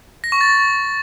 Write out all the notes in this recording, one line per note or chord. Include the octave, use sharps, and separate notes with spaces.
A#6
C#6
A6